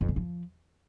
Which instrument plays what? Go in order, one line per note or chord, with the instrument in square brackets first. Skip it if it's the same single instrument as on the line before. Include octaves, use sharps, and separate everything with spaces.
[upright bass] F2
C#3
F3